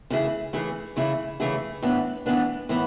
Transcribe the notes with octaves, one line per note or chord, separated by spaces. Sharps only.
C#3 E3 A3 E4 G#4
C#3 E3 A3 E4 G#4
C#3 E3 A3 E4 G#4
C#3 E3 A3 E4 G#4
A2 E3 B3 D4
A2 E3 B3 D4
A2 E3 B3